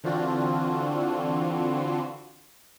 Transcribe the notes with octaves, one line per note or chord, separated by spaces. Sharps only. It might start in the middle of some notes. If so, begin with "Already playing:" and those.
D3 E3 C4 D4 F4 F#4